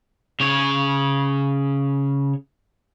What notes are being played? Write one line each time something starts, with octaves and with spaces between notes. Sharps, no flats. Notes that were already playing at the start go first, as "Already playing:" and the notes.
C#3 C#5